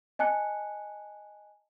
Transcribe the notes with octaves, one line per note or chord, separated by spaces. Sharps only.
D#5 G#5 A5 F#6 C#7